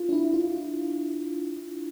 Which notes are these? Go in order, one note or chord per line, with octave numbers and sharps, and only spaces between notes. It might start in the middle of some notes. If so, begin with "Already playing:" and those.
Already playing: F4
D4
E4
F4